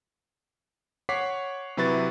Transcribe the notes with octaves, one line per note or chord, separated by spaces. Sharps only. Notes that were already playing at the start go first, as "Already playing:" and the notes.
C#5 F#5 C#6 D6 B6 C7
C3 F#3 E4 B4 C#6 A6